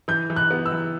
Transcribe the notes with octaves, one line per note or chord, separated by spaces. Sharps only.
E3 G6
E3
F#6
B3
E6
E3